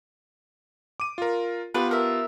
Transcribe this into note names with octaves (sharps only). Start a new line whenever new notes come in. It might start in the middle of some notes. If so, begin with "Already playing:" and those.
D6 D#7
F4 A#4
B3 F4 G4 B4
A#4 E5